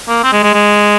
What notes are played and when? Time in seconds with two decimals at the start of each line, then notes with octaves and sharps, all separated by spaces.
0.08 A#3
0.23 C4
0.33 G#3
0.43 G#3
0.54 G#3